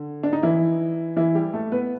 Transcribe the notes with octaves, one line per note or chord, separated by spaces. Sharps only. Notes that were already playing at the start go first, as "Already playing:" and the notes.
Already playing: D3
D4
D#4
E3 E4
E3 E4
G3 G4
A3 A4
B3 B4